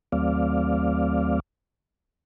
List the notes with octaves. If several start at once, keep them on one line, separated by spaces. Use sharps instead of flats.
D#2 F#3 A3 C4 D5 F5